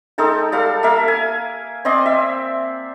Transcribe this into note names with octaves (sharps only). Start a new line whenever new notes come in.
G#3 D#4 A4 G5
G3 A4 F5
A#3 A4 E5 F5
G#5
C4 D5 D#5 C6
E5